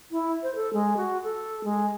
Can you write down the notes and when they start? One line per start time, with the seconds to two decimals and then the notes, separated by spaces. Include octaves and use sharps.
0.11 E4
0.43 C5
0.55 A4
0.73 G#3
0.97 F#4
1.23 A4
1.64 G#3